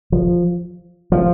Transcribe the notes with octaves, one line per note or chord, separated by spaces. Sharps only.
F3
F3